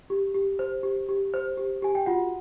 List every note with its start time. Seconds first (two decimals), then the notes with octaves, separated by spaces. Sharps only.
0.10 G4
0.34 G4
0.59 C5
0.83 G4
1.09 G4
1.34 C5
1.57 G4
1.82 G4 G#5
1.95 G5
2.06 F4 F#4 F#5